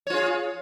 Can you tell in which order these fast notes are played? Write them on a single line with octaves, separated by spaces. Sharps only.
C#5 F4 G#4